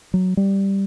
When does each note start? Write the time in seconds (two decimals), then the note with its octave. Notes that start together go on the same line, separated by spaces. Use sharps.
0.14 F#3
0.37 G3